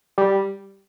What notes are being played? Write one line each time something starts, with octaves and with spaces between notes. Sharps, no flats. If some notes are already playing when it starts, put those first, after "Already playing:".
G3